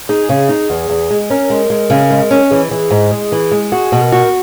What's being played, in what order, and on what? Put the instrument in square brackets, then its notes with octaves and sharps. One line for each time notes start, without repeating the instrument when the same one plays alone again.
[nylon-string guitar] D#4 [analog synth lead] G#4
[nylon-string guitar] C#3
D#4
E2
E2
G#3
[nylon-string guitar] C#4 [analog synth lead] A#4
[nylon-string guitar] G#3
G#3
C#3
G#3
C#4
[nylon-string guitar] E3 [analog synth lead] G#4
[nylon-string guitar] E3
G#2
G#3
E3
G#3
[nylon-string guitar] F#4 [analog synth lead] G#4
[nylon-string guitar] B2
[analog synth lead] A#4
[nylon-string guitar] F#4